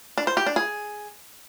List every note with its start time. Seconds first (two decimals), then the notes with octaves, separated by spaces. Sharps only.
0.18 D4
0.27 C5
0.37 G4
0.47 D4
0.56 G#4